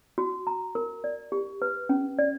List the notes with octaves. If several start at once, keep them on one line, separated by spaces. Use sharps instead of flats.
F#4
A#5
A#4
D5
G4
B4
C#4
D5